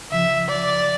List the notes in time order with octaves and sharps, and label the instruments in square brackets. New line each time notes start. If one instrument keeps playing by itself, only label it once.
[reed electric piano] C#2 C#3 F3 [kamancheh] E5
[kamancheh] D5